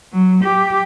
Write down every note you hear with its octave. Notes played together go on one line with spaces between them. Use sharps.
F#3
G4